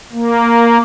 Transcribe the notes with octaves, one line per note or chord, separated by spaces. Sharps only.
A#3